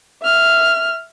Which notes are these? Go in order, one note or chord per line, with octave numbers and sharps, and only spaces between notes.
E5 F6